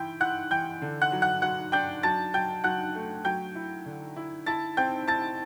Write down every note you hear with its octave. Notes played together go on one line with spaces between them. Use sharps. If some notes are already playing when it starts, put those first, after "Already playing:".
Already playing: E3 E4 G5 G6
E4 F#5 F#6
E3 G5 G6
D3
F#5 F#6
F#3
F#5 F#6
F#3 F#5 F#6
D4 G5 G6
F#3 A5 A6
F#3 G5 G6
F#3 F#5 F#6
A3
F#3 G5 G6
E4
D3
E4
E4 A5 A6
C4 G5 G6
E4 A5 A6